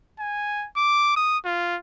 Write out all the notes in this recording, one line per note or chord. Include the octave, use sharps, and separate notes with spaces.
G#5
D6
D#6
F4